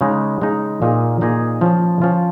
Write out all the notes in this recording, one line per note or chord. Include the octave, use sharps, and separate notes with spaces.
C#3 G#3 D#4
C#3 G#3 D#4
A#2 A#3 D#4 G#4 D#5
A#2 A#3 D#4 G#4 D#5
F3 C#4 F4
F3 C#4 F4